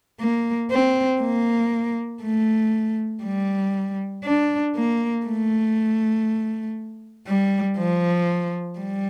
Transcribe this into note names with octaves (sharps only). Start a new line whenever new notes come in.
A#3
C4
A#3
A3
G3
D4
A#3
A3
G3
F3
G3